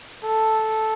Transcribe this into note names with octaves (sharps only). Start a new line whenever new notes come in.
A4